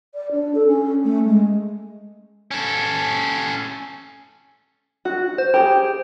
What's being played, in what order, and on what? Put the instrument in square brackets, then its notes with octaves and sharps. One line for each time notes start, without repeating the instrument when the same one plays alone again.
[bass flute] D5
D4
A4
C#4
A3
G#3
[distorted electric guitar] C#4 A4
[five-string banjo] F#4
[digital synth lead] C5
[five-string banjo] G4 G#4